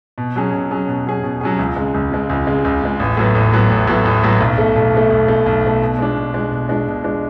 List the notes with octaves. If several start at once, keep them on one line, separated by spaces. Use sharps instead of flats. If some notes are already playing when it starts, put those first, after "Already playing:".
B2
F#3 C#4 G#4
B2
F#3 C#4 G#4
B2
F#3 C#4 G#4
B2
F#3 C#4 G#4
C#2
C#3 G#3
C#2
C#3 G#3
C#2
C#3 G#3
C#2
C#3 G#3
A1
A2 F#3 B3
A1
A2 F#3 B3
A1
A2 F#3 B3
A1
A2 F#3 B3
B1
B2 A3
B1
B2 A3
B1
B2 A3
B1
B2 A3
B2
G#3 D4
B2
G#3 D4
B2
G#3 D4
B2
G#3 D4